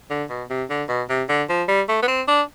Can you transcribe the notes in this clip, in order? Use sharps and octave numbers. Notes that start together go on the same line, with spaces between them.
D3
B2
C3
D3
B2
C3
D3
F3
G3
A3
B3
C4
D4